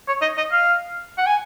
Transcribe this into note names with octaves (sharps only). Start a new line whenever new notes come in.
C#5
D#5
D#5
F5
F#5
G#5